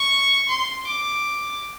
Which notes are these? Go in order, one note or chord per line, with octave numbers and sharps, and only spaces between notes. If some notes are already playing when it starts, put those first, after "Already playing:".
Already playing: C#6
C6
D6